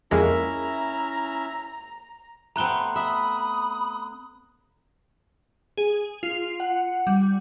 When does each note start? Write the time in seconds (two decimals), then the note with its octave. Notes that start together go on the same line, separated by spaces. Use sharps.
0.11 F2 G#3 A#3 C#4 E4 E5 A#5
2.56 A3 B3 C4 A#5 B5 F#6 G7
2.96 E5 B5 D#6
5.77 G#4
6.23 F4
6.60 F#5
7.07 G3